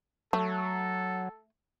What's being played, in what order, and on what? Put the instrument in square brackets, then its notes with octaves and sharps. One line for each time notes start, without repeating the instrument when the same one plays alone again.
[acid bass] F#3 [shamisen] A3 [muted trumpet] A4